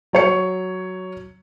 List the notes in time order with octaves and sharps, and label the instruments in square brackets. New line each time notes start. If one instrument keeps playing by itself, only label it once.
[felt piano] F#3 C#5 C#7